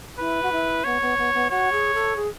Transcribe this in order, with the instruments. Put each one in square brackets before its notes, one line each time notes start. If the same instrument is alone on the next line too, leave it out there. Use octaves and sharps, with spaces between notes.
[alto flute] E4 [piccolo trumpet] B4
[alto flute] F#4
E4
[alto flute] B3 [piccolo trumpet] C#5
[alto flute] B3
B3
B3
[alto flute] F#4 [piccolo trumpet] C#5
[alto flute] G#4
A4
G#4